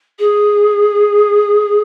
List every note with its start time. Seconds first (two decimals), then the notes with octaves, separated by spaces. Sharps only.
0.19 G#4